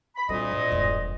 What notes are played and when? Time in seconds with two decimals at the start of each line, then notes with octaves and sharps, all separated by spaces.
0.16 B5
0.29 D2 A#2 G3 C4 D#5
0.51 G#2
0.72 E1 G2